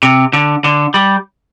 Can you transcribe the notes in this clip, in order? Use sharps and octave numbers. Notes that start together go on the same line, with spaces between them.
C3
D3
D3
G3